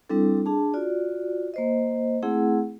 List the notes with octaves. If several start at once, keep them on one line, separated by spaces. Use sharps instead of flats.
G3 C4 D4 E4 A4
D4 G#4 A5
F4 F#4 D5
A#3 C5 D#5
A3 C4 E4 G#4 F#5